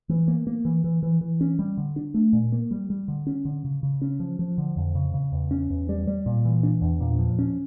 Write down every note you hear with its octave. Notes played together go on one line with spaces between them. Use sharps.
E3
A#3
A#3
E3
E3
E3
E3
C#4
G3
D3
D4
A3
A#2
A#3
G3
G3
D3
C#4
D3
C#3
C#3
C#4
F3
F3
D3
F2
C#3
C#3
E2
C#4
E2
G3
G3
A#2
E3
D4
E2
A#2
F3
C#4